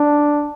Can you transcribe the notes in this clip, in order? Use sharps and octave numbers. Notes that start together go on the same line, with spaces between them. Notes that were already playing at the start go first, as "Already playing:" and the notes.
Already playing: D4